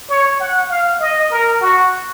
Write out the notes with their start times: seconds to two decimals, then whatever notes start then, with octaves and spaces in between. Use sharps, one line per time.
0.09 C#5
0.40 F#5
0.69 F5
1.00 D#5
1.31 A#4
1.61 F#4